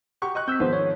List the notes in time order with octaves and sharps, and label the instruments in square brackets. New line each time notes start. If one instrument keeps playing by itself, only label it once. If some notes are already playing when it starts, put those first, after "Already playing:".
[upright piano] F#4 G4 C#6
D#5 C#6 F#6
[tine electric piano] C4 E6 [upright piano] G6 B6
[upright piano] G#2 D#3 F3 [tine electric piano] B3 C5
[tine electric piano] C#5